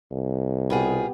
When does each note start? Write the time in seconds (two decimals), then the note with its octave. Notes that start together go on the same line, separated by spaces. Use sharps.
0.11 C2
0.70 B2 B3 F4 G4 G#4